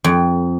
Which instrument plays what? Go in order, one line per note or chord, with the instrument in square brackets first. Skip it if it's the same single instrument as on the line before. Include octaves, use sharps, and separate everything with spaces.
[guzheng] F2